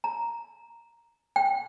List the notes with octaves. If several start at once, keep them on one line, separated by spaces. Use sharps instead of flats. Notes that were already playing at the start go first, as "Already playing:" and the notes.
A#5
G5